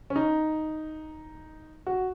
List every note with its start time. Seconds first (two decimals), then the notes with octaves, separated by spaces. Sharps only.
0.10 C#4
0.16 D#4
1.87 F#4